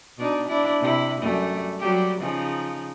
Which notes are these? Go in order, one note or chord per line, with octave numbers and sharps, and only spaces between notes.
B2 D4 D#4
D4 E4
C3 E4
F#2 G3 A3
F#3 G3 G4
C#3 F3 D#4